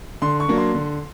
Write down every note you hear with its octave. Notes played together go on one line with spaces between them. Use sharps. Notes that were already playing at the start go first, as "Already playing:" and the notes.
D3 C6
C#6
F#3 A#3 D4
C6
D3